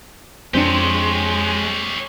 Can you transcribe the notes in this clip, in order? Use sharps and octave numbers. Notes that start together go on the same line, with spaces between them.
F2 G#3 C4 D4 G4 C#5